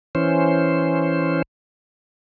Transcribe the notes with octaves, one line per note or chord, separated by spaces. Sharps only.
E3 C#4 C5